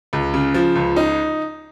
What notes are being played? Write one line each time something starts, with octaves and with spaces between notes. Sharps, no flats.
C#2
C#3
F3
C#2
D#4